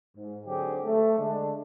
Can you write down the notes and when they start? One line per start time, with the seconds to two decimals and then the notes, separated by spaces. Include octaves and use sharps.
0.16 G#2
0.45 G#2 D3 F#3 C4 G4 G#4
0.84 A3
1.18 D3 G#3 D4